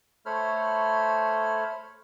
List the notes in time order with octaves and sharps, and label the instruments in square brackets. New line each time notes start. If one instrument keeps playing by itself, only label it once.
[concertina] A3 A4 C5 C#5 B5 F6